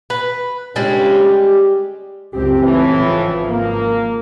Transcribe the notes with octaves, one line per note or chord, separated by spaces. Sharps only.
B4
G1 C#3 G3 G#3
G4
C#2 F#2 C4 G4
A2 E3
G#1 C#3 F3
A#3